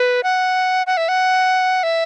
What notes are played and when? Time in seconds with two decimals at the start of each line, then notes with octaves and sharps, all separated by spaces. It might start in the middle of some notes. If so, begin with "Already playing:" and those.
Already playing: B4
0.23 F#5
0.87 F#5
0.97 E5
1.09 F#5
1.83 E5